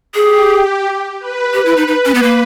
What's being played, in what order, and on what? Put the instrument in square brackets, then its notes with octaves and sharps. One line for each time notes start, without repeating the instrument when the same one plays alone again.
[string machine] G4 [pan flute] G#4
[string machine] B4
[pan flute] G4
E4
D#4
[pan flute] D#4 [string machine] B4
[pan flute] C#4
B3
A#3